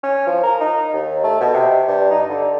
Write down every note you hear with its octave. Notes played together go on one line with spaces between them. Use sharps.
C#4
F3
A#4
D#4
D#2
A3
B2
C3
G2
D#4
D3